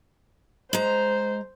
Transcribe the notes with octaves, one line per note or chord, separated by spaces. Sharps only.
G#3 C5 A#5